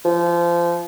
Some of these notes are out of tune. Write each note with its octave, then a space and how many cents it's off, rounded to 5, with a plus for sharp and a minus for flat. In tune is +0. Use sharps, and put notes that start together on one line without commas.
F3 -25